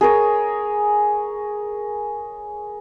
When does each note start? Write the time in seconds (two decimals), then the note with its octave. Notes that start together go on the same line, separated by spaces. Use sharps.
0.01 G#4 A#4 C#5